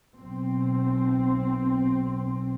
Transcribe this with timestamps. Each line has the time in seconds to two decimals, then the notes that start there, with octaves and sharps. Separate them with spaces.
0.17 B1 C4